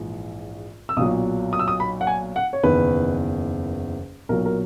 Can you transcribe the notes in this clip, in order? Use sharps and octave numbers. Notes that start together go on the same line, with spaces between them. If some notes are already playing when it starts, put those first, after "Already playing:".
Already playing: A#1 G#2 E3
E6
B1 A#2 F#3 D#6
D#6
E6
D#6
B5
F#5
G#5
F#5
C#5
F#1 E2 D#3 B4
B1 A#2 F#3 A#4
A#4